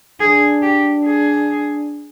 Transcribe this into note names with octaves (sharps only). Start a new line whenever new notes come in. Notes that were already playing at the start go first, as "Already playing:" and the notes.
D4 G#4
G4
G#4